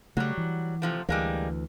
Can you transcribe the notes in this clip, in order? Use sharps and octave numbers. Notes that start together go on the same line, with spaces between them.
C#3 F#3 G3 A3
E3
C3 F3 A3
D2 E3 G3 G#3 A#3